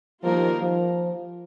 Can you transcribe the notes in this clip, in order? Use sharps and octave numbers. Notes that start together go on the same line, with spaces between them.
D#3 F3 G3 A#3 F4 A#4
F3